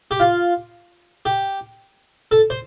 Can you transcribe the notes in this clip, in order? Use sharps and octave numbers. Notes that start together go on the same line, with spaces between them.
G4
F4
G4
A4
C5